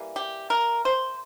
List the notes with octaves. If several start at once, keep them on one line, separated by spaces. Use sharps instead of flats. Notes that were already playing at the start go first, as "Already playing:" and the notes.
Already playing: E3 G3 A#3
G4
A#4
C5